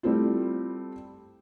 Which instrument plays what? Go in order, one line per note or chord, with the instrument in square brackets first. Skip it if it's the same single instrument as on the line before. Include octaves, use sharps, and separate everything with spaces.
[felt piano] G3 A3 C4 E4 F4